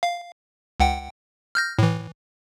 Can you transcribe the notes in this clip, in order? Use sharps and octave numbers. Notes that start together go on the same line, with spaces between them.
F5
C#2 F#5 G5
F6 G6 A#6
A2 E3